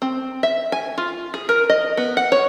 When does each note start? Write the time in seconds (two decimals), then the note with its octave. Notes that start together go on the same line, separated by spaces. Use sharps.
0.02 C4
0.43 E5
0.72 G#5
0.98 F4
1.34 G#4
1.49 A#4
1.70 D#5
1.97 B3
2.17 F#5
2.32 C#5